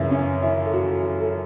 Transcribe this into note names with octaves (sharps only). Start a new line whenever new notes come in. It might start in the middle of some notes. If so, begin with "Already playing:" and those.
Already playing: F#2 C#3 E3 E4
C#4
E4
A4
F#4
A4